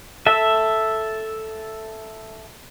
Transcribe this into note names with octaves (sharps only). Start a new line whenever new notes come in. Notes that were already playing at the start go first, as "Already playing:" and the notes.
A4 E5